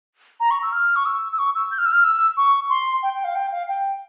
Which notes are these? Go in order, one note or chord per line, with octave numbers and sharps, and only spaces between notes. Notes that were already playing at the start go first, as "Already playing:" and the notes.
A#5
C#6
E6
F6
C#6
E6
E6
C#6
E6
G6
F6
E6
F6
E6
C#6
C6
G5
G5
F5
G5
F5
G5